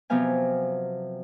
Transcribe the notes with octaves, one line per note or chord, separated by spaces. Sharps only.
C3 F3 F#3 B3 F5 G#5